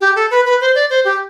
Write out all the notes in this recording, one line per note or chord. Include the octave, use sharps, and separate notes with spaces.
G4
A4
B4
B4
C5
D5
C5
G4